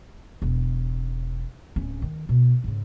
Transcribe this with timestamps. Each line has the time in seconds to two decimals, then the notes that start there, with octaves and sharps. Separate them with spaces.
0.42 E1
1.76 D1 C#4
2.02 D#3
2.29 B2
2.64 G#2 C#3